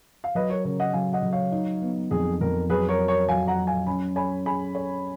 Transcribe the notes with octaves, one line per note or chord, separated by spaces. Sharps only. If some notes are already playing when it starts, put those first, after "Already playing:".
F5
F#3 B4 D#5
A#4 C#5
C#3 A#4 C#5
D#5 F#5
F#3 F5 G#5
D#5 F#5
F#3
C#5 F5
D#4
B3
F2 G#4
F2 A#4
F#3 G#4 B4
A#4 C#5
F#4
A#4 C#5
F#3 F5 G#5
F#5 A#5
F#3
F5 G#5
C#4 G#5 B5
C#5 G#5 B5
G#4 G#5 B5
C#5